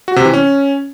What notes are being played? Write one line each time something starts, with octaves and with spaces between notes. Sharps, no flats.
F#4
C3
E3
C#4